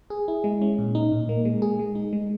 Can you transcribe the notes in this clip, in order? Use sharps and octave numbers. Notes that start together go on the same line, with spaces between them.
G#4
E4
G#3
C#4
A#2
D#4
A#2
A#3
G#3
G#4
G#3
D#4
G#3